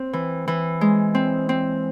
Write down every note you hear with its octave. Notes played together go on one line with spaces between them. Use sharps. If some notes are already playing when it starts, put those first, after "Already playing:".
Already playing: C4
E3
E3
G#3
C4
C4